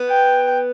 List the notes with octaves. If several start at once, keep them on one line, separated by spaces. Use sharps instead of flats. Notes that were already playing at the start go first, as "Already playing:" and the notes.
Already playing: B3
G5